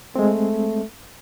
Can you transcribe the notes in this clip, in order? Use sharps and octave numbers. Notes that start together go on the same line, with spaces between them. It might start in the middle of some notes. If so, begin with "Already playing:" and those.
G#3 A3 C4